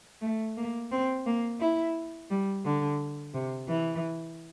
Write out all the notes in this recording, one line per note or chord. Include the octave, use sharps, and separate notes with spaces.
A3
A#3
C4
A#3
E4
G3
D3
C3
E3